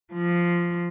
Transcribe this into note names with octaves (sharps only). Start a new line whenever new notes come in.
F3